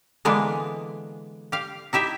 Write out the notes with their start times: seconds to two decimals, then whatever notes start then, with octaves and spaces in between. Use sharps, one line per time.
0.25 D3 E3 G#3 A#3 B3 D4
1.52 G4 F5
1.93 D#4 E4 G4 E5